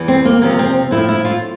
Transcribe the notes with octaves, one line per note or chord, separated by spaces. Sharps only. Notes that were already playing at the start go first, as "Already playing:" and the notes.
Already playing: E2 E3
C4
A#3
E2 C3 F3 A#3
C4
A2 F3 E4
E4
F4